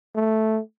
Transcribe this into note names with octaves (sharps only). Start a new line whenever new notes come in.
A3